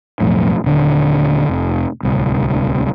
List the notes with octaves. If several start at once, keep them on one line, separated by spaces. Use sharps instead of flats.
B1 F2 A2
D#1 D3
F1
D1 C2